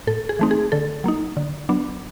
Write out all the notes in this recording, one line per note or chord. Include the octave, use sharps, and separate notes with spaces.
A2 A4
G#4
E3 A3 C4 D#4
G#4
D3 A4
F#3 A#3 D#4
D3
F#3 B3 D4